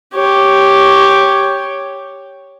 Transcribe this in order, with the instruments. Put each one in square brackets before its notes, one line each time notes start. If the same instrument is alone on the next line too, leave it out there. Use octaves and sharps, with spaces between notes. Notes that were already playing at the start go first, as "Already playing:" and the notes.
[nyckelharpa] G4 C#5